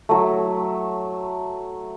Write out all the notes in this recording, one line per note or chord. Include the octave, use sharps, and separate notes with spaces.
F#3 A3